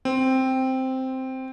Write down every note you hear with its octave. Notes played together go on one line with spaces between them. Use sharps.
C4